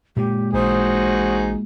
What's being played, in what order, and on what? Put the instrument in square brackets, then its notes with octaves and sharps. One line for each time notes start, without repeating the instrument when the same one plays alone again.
[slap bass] A#2 G#3 [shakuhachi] G4
[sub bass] A1 [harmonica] D#4 F#4 G#4 [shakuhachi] C5